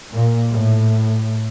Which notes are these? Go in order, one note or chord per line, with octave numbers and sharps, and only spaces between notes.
A#2
A2